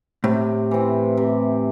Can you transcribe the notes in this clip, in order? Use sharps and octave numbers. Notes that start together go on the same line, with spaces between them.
A2 C3
E3 C4
C3